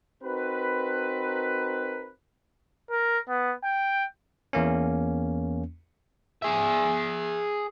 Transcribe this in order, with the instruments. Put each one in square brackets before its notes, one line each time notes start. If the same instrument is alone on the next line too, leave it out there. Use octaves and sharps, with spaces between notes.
[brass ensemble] C4 D#4 F#4 A#4 B4
[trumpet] A#4
B3
G5
[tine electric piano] E2 A#3 C#4
[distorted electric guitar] G#4 E5